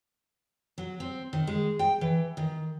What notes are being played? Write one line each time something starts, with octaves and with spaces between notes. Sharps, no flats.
F#3
C4
D#3
G#3
G5
E3
D#3